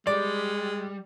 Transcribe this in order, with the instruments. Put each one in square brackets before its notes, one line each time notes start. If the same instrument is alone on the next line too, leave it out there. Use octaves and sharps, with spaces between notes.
[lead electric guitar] G3 [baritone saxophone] G#3 [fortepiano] D5